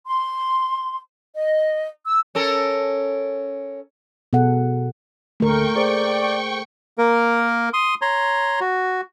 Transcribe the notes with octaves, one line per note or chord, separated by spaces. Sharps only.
C6
D#5
E6
C#4 A4 A#4
B2 G#4 A4 F#5
D2 D3 A3 A#4 G5 C#6
G#4 C5 D5
A#3 A#4
C6 D#6
C#5 A#5 C6
F#4